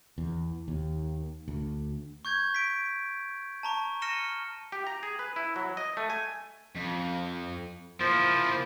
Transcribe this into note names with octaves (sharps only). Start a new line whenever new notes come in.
E2
D#2
D2
C#6 G6 G#6
B6 D7
A5 A#5 C#6
F6 A#6 C#7 D#7 E7 G7
G4
A#5
G#4
B4
E4
F#3
D#5
A3
G#5
F2
F3 A#3 E4